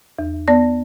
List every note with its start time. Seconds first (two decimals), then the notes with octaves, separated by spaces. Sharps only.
0.19 E2
0.48 B3 D5 A#6